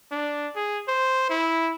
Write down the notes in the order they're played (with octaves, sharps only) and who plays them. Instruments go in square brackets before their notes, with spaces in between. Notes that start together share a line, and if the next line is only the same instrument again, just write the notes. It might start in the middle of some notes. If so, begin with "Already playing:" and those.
[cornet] D4
G#4
C5
E4